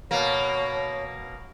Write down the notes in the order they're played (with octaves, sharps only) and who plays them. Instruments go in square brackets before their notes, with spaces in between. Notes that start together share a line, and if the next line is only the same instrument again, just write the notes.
[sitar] B2 A#3 [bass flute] C#5